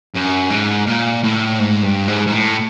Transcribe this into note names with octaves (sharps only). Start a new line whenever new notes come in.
F#2
G#2
A#2
A2
G#2
G2
G#2
G#2
A2